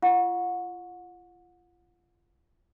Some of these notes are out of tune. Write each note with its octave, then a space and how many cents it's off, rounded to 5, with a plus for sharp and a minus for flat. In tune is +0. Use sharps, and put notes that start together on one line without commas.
F4 -30 F#5 -35 C#6 +0